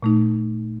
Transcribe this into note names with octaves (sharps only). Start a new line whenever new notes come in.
A#2 A3 D#4